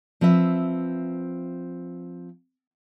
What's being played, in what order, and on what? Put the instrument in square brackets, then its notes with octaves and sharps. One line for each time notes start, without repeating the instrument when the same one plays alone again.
[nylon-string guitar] F3 C4 B4 E5